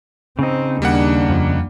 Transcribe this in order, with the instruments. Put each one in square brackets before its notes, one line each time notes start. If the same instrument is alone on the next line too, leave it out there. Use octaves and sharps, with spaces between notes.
[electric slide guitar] C#3 D#4 [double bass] C4
[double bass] D#2 D4 [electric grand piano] G3 A#3 F#5
[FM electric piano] F2 F3